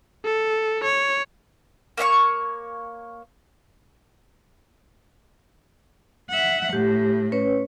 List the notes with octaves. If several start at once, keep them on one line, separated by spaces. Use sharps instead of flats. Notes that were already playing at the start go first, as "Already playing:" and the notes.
A4
C#5
A#3 C#5 E5 C#6
E5 F#5
A2 G4
C#4 B4 C#5